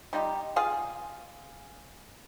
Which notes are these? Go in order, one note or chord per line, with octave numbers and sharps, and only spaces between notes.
G3 D#4 F4 G4
F4 G#4 F5